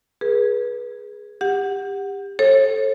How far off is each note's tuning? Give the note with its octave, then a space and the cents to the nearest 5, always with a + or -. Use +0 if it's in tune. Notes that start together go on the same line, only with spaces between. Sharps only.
G#4 +0 B4 -30
G4 +25 F#5 +0
A4 +0 C#5 -45